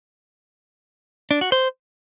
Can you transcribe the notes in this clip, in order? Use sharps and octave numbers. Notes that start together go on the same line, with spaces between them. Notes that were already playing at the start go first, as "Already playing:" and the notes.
D4
F#4
C5